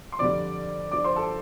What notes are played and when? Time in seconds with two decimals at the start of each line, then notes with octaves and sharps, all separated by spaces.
0.12 C6
0.19 F2 D3 G3 D5 D6
0.91 G2 F3 D5 D6
1.04 C5 C6
1.16 A4 A5